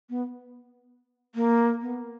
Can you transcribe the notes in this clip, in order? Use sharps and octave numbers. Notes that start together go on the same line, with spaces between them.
B3
A#3
B3